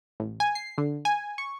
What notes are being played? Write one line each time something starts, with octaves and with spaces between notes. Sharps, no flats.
A1
G#5
C7
D3
G#5
C#6